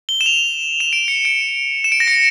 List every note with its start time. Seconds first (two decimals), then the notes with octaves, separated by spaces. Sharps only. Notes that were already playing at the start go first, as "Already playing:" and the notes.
0.09 G7
0.21 E7
0.26 F7
0.80 E7
0.93 D7
1.08 C#7
1.25 D7
1.84 E7
1.92 D7
2.00 A#6
2.08 C#7